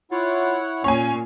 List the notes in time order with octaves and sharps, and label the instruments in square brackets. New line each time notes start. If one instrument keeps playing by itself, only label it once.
[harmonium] E4 C#5 F#5 [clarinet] F4
[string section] A#2 [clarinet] C#4 [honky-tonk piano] C#5 G#5